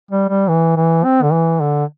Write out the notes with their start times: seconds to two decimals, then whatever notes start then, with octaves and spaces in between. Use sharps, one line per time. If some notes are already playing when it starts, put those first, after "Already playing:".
0.11 G3
0.29 G3
0.48 E3
0.76 E3
1.04 C4
1.23 D3
1.33 E3
1.61 D3